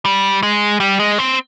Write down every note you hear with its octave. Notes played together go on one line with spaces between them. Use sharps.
G3
G#3
G3
G#3
C4